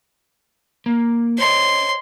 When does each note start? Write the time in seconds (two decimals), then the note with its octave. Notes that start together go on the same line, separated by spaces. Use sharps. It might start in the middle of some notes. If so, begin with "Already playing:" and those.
0.86 A#3
1.39 C5 C#5 D#5 C6